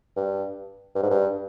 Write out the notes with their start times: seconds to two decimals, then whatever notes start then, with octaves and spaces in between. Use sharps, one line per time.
0.17 G2
0.95 G2
1.02 G#2
1.11 G2